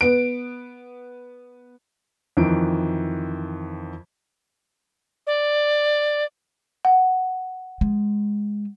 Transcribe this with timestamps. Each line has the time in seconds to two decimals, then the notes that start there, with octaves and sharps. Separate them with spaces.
0.01 B3 D7
2.37 F2 D#3 E3 D7
5.27 D5
6.85 F#5
7.81 G#3